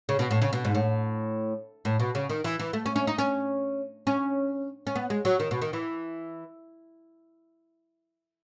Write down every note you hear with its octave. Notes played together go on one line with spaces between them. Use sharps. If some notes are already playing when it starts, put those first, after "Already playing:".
C#3
B2
A2
C#3
B2
G#2
A2
A2
B2
C#3
D#3
E3
E3
A3
C#4
C#4
D#4
C#4
C#4
C#4
B3
G#3
F#3
D#3
B2
D#3
E3